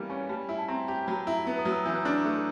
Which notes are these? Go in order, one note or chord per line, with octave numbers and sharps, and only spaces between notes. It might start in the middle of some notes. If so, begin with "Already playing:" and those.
Already playing: E3 G3 A#3 B3
C#4 G#5
G3 A5
E4
A5
C4 A#5
G4
F#3 B5
A#5
E4
A#5
B3 A#5
D#6
F#3
E6
E3 G6
F#6
D4 F6
F#6
A3